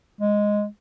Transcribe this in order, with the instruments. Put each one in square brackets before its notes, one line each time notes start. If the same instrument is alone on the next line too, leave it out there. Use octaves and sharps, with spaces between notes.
[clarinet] G#3